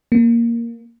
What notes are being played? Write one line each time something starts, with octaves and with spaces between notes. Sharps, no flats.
A#3